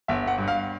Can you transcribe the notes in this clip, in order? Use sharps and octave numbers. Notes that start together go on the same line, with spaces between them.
G1 E5
F#5
G2
F5